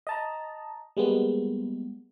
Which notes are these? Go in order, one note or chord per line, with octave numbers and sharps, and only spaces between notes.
D#5 A5 A#5
G3 G#3 A#3 B3